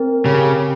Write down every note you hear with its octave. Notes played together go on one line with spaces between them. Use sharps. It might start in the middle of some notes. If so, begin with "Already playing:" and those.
Already playing: C4 A#4
C#3 G4